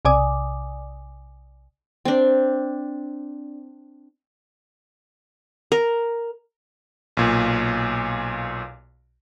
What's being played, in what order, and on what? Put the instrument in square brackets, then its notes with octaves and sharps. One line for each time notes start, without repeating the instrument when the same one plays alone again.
[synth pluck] B1 C3 D5 G#5 D6 D#6
[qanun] C4 D4
A#4
[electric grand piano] B1 A#2